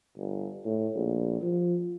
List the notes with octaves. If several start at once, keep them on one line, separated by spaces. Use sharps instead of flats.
G1
A2
A#1
F3